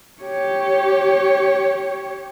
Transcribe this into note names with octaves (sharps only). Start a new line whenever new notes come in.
G4 C#5